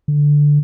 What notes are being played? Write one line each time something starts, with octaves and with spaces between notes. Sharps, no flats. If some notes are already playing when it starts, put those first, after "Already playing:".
D3